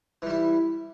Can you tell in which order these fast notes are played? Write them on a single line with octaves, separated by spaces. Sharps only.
E3 G3 E4